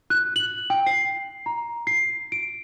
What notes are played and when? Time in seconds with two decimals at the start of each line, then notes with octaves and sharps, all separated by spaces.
0.10 F#6
0.36 F#7
0.70 G5
0.86 C7
1.46 A#5
1.87 C7
2.32 D7